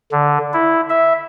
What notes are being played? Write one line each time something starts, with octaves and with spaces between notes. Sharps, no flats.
D3
E4
E5